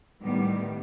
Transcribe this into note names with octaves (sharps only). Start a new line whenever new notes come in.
A2 D#3 G3 B3